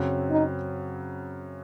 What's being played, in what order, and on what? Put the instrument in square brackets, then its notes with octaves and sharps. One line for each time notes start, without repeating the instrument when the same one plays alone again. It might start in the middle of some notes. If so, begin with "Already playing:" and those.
Already playing: [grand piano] F#2 C#3 F#3 C4
[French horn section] D#4